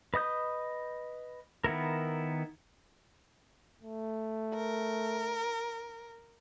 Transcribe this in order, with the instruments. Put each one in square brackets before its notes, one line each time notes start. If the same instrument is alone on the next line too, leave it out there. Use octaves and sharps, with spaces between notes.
[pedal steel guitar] B4 D#5 D#6 G6
D#3 B3 E4 A#4
[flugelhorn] A3
[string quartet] A#4